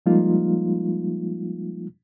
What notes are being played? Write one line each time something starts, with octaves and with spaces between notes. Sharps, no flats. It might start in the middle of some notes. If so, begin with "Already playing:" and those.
F3 G3 G#3 A#3 D#4 F4